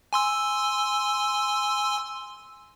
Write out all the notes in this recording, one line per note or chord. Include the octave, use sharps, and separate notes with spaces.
G#5 C6 E6